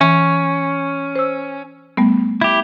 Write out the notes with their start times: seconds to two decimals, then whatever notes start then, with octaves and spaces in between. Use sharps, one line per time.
0.01 E3 C#4
1.16 C5 E6
1.97 G3 A3 B3
2.41 E4 G4